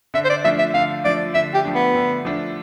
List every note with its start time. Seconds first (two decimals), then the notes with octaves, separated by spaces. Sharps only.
0.14 D3 E5
0.24 C5
0.30 D5
0.44 F3 A3 D4 E5
0.59 E5
0.74 D3 F5
1.04 F3 A3 D4 D5
1.34 D3 E5
1.54 G4
1.65 F3 A3 D4
1.75 B3
1.95 D3
2.25 F3 A3 D4